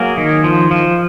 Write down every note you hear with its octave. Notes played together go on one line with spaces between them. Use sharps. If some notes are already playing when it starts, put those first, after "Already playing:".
Already playing: F#3 A#3 G#4
D#3
F3
F3